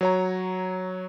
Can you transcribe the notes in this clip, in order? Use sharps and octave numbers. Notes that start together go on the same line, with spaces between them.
F#3 C#5 A#5